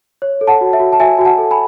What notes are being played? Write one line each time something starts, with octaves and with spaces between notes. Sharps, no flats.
C#5
A4
F#5 A5
F#4
E5
F#4
A5
F#4 E5 G#5
F#4 G#5
F#5 A5
A4
G#5 B5